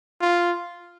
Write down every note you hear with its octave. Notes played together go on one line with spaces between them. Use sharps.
F4